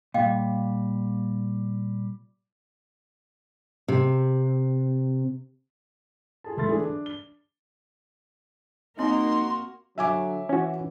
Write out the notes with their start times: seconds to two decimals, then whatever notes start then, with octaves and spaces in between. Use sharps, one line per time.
0.14 A#2 G3 D#5 F5 G5
3.88 C3
6.44 F4 G#4 A5
6.57 D1 C#2 A3 C6 A6
6.69 E3 D4 G#4 A4 D5
6.84 D4
7.06 G7
8.99 A#3 C4 D#4 F#4 A#4 C6
9.98 D3 F#3 E5 G#5 D6
10.49 E3 C#4 F#4